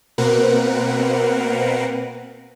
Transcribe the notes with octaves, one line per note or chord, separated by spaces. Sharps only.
B2 A#3 C4 A#4 B4 F#5